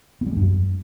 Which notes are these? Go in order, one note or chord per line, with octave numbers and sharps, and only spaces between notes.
B3
G3
G#3
G2
F#2